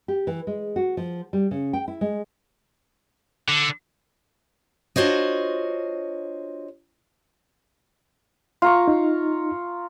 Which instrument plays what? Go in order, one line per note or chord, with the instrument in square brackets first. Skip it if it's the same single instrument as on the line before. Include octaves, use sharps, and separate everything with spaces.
[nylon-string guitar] G4
E3
G#3
F#4
F3
G3
C#3
G5
E4
G#3
[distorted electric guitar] D3
[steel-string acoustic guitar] D4 F4 F#4 C5 C#5 D#5
[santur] F4 A#5 C#6
[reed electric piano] D#4